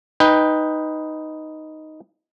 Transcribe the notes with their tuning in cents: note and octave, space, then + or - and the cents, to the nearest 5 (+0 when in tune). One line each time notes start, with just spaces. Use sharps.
D#4 +0 B4 +0 G5 +15